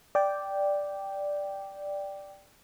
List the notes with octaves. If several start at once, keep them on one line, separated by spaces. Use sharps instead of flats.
D5 G5